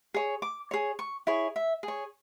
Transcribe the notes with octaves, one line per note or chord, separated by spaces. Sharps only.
G#4 C#5
D6
G#4 C#5
C#6
E4 G#4 C#5
E5
G#4
C#5